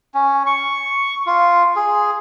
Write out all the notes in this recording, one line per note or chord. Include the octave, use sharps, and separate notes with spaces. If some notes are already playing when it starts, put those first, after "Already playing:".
C#4
C#6
F4
G#4